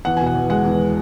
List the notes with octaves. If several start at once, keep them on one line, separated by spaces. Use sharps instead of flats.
E2 F#5
B2 G#5
F#5
E2
G#3 F#5
E2